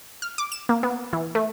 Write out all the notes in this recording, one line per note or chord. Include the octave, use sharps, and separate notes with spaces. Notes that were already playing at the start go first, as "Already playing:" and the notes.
F6
D6
E7
A#3
B3
E3
A3